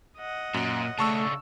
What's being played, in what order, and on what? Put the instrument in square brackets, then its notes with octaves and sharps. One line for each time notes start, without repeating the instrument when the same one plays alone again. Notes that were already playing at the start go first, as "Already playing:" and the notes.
[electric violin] D#5 F#5
[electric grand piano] F#2 [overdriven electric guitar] A#2
[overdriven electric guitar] C#3 D4 [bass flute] A3 [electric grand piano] A5 C#6 E6